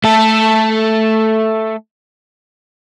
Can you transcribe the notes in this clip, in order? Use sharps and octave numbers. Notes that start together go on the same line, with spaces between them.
A3 A4